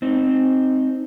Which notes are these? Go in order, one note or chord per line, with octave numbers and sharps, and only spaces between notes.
C4 D#4